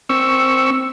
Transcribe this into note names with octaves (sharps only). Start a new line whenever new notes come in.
C4 C#6 E6